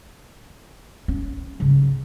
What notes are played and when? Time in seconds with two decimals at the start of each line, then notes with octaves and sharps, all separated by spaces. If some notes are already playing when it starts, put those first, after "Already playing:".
1.08 C#4
1.60 C#3 F#3